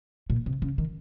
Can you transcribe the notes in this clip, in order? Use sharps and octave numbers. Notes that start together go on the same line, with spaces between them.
A#2
C3
C#3
D#3